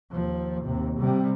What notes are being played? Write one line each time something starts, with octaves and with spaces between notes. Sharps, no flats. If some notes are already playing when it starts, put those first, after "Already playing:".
D#2 F3
D#2 C3
C3 G3